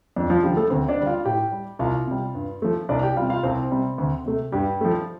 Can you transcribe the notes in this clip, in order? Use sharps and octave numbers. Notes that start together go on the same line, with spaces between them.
F2 D4
F3 F4
D3 F3 G3 G4
A3 A4
D2 C4 C5
D4 D5
D3 G3
F4 F5
A2 G4 G5
G3
C2 F4 F5
C3 G3
G2
F3 A3
C2 D4 D5
G4 G5
C3 G3 F4 F5
F4 F5
C2 C4 C5
C3 G3
D2
C3 A3
G2 G3 G4
F3 A3